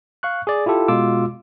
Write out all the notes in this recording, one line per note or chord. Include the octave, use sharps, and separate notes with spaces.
F5 C#6 F#6
G#4 D5
E4 F4 G4 A4
B2 G#3 F4 D6 E6